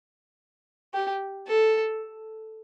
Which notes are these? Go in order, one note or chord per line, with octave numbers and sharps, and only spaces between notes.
G4
A4